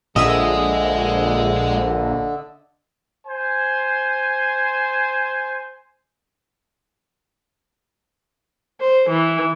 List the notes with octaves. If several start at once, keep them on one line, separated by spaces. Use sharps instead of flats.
A#1 D3 G#3 G#4 D#5 E5 E6
C5 G#5
C5
E3